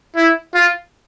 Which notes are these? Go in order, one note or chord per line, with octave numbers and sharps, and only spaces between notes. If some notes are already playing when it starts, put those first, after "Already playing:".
E4
F4